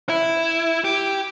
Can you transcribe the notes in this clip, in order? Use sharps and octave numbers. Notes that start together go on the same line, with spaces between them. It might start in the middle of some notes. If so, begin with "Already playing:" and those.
E4
G4